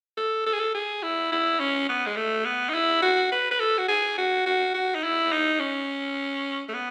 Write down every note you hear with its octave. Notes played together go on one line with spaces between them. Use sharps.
A4
A4
G#4
A4
G#4
E4
E4
C#4
B3
G#3
A3
B3
D#4
E4
F#4
B4
B4
A4
F#4
G#4
F#4
F#4
F#4
D#4
E4
D#4
C#4
A3
B3